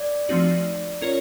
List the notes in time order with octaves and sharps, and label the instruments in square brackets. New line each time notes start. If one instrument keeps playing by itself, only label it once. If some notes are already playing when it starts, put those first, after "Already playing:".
Already playing: [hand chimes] D5
[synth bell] F3 A3 C4 D#4 F#4
C#4 F4 A#4 C#5